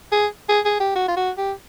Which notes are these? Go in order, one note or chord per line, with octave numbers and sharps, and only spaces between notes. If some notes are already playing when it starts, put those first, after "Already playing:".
G#4
G#4
G#4
G4
F#4
F4
F#4
G4